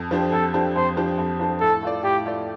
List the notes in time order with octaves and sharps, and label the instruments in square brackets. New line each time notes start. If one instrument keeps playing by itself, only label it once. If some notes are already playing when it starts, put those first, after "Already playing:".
Already playing: [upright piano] F2
F3 D4 G4 C5
[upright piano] F2 [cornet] A4
[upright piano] F3 D4 G4 C5
[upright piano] F2 [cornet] C5
[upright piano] F3 D4 G4 C5
F2
F3 D4 G4 C5
[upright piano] A2 [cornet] A4
[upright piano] A3 F4 D5
[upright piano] A2 [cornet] G4
[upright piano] A3 F4 D5